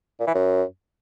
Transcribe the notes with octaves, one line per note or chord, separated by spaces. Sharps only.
A#2
E3
F#2